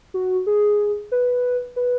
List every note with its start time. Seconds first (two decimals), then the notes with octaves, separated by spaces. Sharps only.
0.14 F#4
0.47 G#4
1.12 B4
1.76 B4